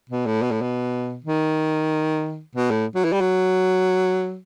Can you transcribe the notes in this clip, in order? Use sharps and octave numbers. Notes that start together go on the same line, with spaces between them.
B2
A2
B2
A2
B2
D#3
B2
A2
F#3
E3
G3
F#3